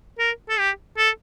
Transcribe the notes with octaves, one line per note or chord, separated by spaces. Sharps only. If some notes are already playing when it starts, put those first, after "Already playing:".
A#4
A4
G4
A4